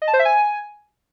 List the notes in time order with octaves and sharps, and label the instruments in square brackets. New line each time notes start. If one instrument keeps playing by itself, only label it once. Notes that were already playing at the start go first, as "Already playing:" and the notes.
[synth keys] D#5
A5
C5
E5
G#5